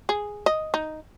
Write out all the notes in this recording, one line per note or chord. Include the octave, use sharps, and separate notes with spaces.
G#4
D#5
D#4